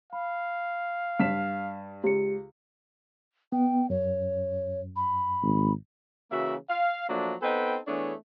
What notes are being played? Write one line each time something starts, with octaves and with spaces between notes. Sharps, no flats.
F5 B5
G2 B6 E7
C#2 G4 C#7
B3 G5
F#2 C#5
B5
G#1
C#3 E3 A#3 F#4 E5
F5
F3 F#3 A3 A#3 D4
B3 C4 D#4 A4 B4 G5
E3 A3 B3 D4 G#4 C#5